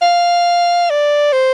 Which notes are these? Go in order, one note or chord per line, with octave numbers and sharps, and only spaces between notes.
F5
D5
C5